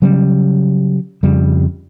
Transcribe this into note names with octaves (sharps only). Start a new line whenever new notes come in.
C#3 F#3 G3 C#4
F2 C#3 G3